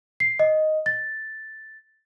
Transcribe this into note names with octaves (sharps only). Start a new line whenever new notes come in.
C7
D#5
A6